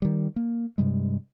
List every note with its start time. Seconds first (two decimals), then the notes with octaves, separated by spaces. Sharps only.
0.02 D#3 G3
0.36 A#3
0.78 G2 C3 G3 G#3